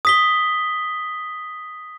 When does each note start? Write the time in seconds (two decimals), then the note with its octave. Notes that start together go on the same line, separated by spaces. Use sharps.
0.05 D#6 B6 G7